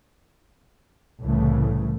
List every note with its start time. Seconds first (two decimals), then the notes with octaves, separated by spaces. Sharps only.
1.24 C2 A2 C#3 E3 A3